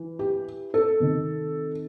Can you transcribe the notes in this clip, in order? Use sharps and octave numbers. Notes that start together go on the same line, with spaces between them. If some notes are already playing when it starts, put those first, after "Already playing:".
Already playing: E3
G4
A4
C3 D#3